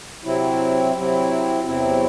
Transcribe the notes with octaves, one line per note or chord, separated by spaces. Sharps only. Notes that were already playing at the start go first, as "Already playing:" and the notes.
C3 F#3 C4 E4
C3 F#3 C4 E4
E2 C3 F#3 C4 E4